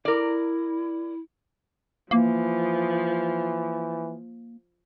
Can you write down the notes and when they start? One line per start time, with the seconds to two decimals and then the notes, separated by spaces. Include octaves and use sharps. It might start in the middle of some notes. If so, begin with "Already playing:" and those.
0.05 E4 A#4 D5
2.11 E3 F3 A#3